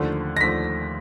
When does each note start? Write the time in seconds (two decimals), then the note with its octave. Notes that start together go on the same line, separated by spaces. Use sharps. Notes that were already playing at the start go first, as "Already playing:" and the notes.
Already playing: D#2 D3 F3 A3
0.37 A#6
0.40 D#2 D3 F3 A3 B6